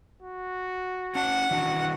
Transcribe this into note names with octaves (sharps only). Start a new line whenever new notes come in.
F#4
C#4 F#5 A5
D#3 E3 D4 F#4